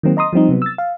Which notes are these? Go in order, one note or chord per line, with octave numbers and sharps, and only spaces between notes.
D#3 F#3 A#3 C4
D#5 A#5 C6 D#6
F3 G3 C4 D#4
C3 F#3 B3
E6 A6
F5